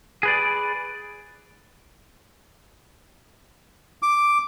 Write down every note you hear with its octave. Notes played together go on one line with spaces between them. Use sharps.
G#4 B4 D5
D6